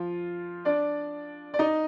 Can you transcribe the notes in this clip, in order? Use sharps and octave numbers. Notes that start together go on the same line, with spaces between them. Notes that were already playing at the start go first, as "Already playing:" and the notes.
Already playing: F3 F4
D4 D5
D5
D#4 D#5